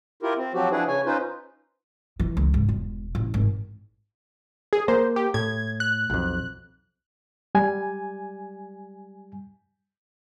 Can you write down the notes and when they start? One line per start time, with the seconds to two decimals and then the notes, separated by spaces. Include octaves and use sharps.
0.23 E4 F4 G4 A#4
0.37 C4
0.54 F3 F#3 C4 F#4 G4
0.71 F3 D4 E4 G#4 B4
0.87 C#3 C#5 G#5
1.06 C#4 D#4 F4 B4 C5
2.20 E3
2.37 C#2
2.54 G#2
2.69 E1
3.15 A1
3.34 G#1
4.73 G#4
4.88 A#3 C5
5.16 G4
5.34 A2 G#6
5.80 F#6
6.10 B1 F2
7.55 G3 G#5